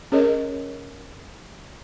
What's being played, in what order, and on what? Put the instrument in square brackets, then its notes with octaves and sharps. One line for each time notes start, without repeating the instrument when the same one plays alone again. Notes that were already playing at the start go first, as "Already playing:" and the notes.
[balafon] C#4 G#4 A#4 C#5 D#5